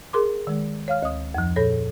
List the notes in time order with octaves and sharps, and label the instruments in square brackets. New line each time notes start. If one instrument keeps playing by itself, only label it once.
[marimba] G#4 A#4 C6 D6
D#3 G#3
C#5 F5 F6
D2 D#6
F2 F3
A#2 A4 C#5 A#6